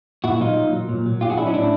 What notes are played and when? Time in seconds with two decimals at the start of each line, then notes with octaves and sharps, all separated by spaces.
0.24 A#2 E4 F#4
0.40 F#3 D#4 F4
0.57 A#2
0.73 F#3
0.89 A#2
1.06 F#3
1.21 A#2 F4 G4
1.30 F#4 G#4
1.37 F#3 D4 E4
1.46 C#4 D#4
1.54 A2 D4 E4